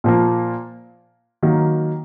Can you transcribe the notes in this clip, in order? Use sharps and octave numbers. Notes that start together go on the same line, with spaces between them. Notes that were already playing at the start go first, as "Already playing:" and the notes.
A#2 F3 A#3
D#3 F#3 A#3